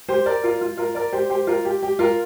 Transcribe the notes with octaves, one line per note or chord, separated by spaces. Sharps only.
G4 C5
A#4 D5
F4 A#4
F4
F4 A#4
A#4 D5
G4 C5
G4 C5
F4 A#4
G4
G4
F4 A#4